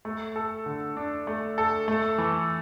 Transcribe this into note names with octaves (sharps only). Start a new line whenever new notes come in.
A3
A4
D3
D4
A3
A4
A3
E3